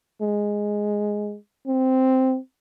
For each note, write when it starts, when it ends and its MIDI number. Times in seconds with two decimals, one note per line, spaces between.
0.22 1.36 56
1.67 2.38 60